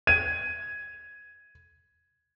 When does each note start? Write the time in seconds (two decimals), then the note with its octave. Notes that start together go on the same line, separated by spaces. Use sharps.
0.07 G#6 D#7